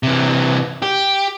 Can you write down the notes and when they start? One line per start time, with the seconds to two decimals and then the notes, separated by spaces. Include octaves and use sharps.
0.03 C3 E3
0.82 G4